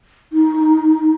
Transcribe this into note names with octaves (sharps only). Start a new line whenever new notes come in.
D#4